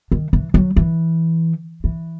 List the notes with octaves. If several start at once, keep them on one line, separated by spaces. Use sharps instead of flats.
D#3
E3
F#3
E3
E3